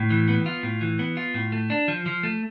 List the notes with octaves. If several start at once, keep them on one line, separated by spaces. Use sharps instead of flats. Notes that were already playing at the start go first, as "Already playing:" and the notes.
Already playing: A2
E3
B3
F4
A2
E3
B3
F4
A2
A3
D4
F3
F3
A3